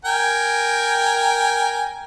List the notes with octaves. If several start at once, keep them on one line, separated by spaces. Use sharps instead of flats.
A#4 G5 G#5